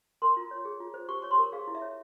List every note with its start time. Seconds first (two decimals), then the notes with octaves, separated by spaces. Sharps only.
0.22 A#4 C6
0.37 F4
0.51 C#5
0.65 G#4
0.80 F4
0.94 C5
1.09 G4 C#6
1.22 C#5 C#6
1.31 C6
1.38 A#4
1.52 G#4 F5
1.67 E4
1.75 E5
1.82 C#5